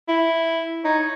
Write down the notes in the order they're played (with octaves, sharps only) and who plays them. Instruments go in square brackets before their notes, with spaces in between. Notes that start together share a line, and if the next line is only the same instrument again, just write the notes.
[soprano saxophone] E4
[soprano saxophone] D#4 [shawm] C#5